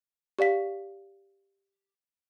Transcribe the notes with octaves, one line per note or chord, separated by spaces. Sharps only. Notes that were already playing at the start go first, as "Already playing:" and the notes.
G4 D5 F5 B6